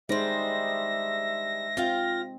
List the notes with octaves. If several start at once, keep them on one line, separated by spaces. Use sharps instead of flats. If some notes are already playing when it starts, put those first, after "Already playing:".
G3 G#3 D4 D#4 C5 E5 A#6
C4 F4 F5 G5